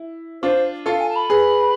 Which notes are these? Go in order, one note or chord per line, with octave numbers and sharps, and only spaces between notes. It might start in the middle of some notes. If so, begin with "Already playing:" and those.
Already playing: E4
D4 F4 C5
F4 A4 F5
G#5
A5
B5
G#4 B4